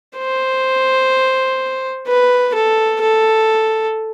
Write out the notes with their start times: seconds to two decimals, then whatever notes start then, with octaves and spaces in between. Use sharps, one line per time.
0.18 C5
2.07 B4
2.54 A4
3.01 A4